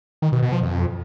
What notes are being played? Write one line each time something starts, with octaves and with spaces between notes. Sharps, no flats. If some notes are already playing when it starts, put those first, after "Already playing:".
D#3
B2
B2
F3
F2